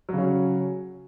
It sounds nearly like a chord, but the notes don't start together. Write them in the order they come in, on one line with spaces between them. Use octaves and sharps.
F#3 C#3 C#4